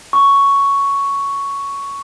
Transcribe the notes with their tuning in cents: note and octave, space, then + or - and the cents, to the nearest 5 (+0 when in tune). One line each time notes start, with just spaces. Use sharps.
C#6 +5